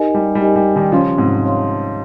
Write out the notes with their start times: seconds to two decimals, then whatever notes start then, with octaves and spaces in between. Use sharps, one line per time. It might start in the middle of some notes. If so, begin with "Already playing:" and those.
Already playing: D#4 G4 A#4 D#5 G#5
0.15 G3
0.35 G3
0.41 D#4 G4 A#4 D#5 G#5
0.56 G3
0.76 D#3 G3
0.92 C#3 F3 G4 C#5 F5 C6
1.17 G#2 C3
1.44 G4 C#5 F5 C6